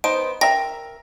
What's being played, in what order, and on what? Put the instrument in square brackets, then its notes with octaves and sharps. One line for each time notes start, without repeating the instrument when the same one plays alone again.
[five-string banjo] B3 D#4 C5 [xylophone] D7
[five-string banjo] A#4 E5 A#5 [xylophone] G5 A#6